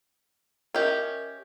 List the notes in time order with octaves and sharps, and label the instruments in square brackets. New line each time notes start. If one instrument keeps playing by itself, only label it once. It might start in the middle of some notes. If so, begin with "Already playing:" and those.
[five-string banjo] C#4 G4 [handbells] A#4 D#5 E5